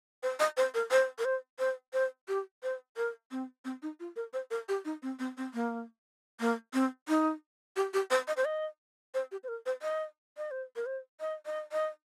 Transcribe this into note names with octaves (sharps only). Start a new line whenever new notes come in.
C5
D#5
C5
A#4
C5
A#4
C5
C5
C5
G4
C5
A#4
C4
C4
D#4
F4
A#4
C5
A#4
G4
D#4
C4
C4
C4
A#3
A#3
C4
D#4
G4
G4
C5
D#5
C5
D#5
C5
G4
C5
A#4
C5
D#5
D#5
C5
A#4
C5
D#5
D#5
D#5